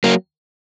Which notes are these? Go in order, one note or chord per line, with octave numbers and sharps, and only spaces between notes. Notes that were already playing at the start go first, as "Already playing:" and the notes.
F#3 A#3